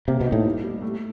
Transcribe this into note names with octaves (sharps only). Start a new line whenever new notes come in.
C3 A#3
B2
D#4
A2
G3
G3
A3